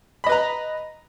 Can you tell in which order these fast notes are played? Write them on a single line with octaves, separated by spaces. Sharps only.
B5 D#5 B4 A#5